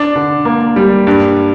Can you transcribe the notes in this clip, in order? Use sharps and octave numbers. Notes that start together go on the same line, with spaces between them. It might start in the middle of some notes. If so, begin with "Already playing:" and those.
Already playing: D4
D3
A#3
G3
G2